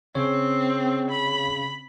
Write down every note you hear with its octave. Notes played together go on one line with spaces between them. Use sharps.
C#3 C4 C#5
B5